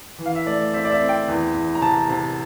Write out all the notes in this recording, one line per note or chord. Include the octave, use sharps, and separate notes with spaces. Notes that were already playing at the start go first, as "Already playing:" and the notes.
E3
F5
E5
A3 D5
C4 E5
D5
E5
C4
G5
E2
E2
A#5
C3 A5
C3